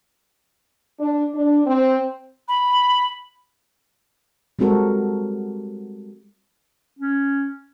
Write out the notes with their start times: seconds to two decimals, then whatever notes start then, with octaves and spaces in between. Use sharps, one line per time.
1.00 D4
1.34 D4
1.66 C4
2.48 B5
4.59 G3 G#3 C4 F#4 A4 A#4
6.99 C#4